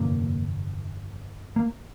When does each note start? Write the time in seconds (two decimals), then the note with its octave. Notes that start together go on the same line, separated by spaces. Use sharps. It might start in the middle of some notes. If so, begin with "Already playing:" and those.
Already playing: G1 F2 C3 A#3
1.56 A#3